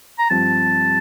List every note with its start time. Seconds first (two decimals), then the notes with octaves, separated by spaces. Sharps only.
0.19 A#5
0.30 G2 F3 C4 A5